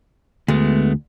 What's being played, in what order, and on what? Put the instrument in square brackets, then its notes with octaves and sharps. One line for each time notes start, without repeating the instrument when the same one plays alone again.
[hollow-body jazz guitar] D2 [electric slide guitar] G#3 A3 B3